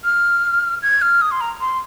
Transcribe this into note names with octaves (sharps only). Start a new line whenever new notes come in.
F6
G#6
F6
D#6
C6
A#5
C6